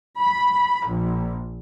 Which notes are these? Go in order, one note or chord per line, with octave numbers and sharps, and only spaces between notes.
B5
A#1